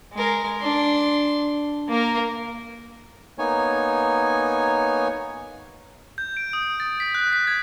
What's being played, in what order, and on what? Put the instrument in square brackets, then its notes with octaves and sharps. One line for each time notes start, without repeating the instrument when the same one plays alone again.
[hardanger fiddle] G#3 A#4
D4 C6
A#3 A#4
[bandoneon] A#3 B3 D#4 C#5 G#5
[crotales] G6
D7
D#6
A6
B6
F#6
B6
G#6